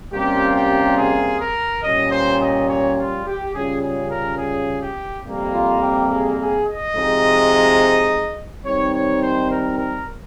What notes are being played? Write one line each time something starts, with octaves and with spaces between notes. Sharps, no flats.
C3 G3 A#3 C#4 F4 G4
G4
G#4
A#4
A#2 G3 C#4 D#5
C5
D#5
C#5
F4
G4
C#3 G3 C#4 F4 G#4
G#4
A#4
G#4
G4
F2 C3 G3 A#3
F4
G4
G#4
G#4
D#5
C3 F3 G#3 D#4
D#3 G3 C4 D#4 C#5
C#5
C5
A#4
A#4